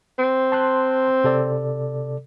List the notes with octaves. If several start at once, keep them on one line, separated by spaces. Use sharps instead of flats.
C4
A5 C6 F#6
C3 A4 D5